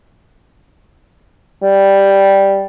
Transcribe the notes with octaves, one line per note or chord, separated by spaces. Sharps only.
G3